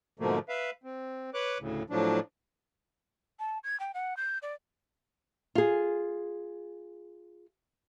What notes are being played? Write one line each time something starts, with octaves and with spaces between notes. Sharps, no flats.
G#2 B2 D3 F3 A3 A#3
B4 E5 F5
C4
B4 C#5 D6 F#6
D2 A2 C#3
A2 F3 F#3 D4
A5
G#6
G5
F#5
G6
D5
F4 G#4